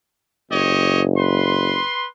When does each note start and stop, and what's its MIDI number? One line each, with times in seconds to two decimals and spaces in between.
0.51 1.78 30
0.51 1.01 67
0.51 1.01 73
0.51 1.01 75
1.18 2.07 71
1.18 2.07 84